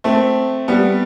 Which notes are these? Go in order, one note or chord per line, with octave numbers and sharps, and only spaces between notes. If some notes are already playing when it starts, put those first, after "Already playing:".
A3 C4
G3 B3